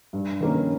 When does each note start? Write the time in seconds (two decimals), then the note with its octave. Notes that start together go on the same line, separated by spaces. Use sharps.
0.13 G2
0.40 D#3 A#3 C#4